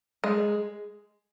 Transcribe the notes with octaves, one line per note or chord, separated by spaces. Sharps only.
G#3